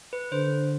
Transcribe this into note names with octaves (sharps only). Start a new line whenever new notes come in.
B4
D3 C5